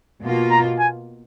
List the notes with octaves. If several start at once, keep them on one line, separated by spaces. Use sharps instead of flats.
B2 A#3 F4
A#5
G#5